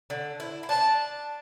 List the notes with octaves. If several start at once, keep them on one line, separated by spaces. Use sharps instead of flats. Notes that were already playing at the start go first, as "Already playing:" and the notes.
D3
E4
E4
D4 A5